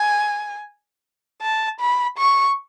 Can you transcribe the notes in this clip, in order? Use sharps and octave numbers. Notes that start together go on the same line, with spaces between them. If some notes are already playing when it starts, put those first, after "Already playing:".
Already playing: G#5
A5
B5
C#6